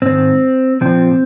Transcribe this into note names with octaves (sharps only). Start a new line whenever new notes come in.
G#2 D#3 C4
A#2 F3 C4